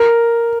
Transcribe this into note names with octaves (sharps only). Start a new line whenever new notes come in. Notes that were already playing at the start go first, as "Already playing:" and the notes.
Already playing: A#4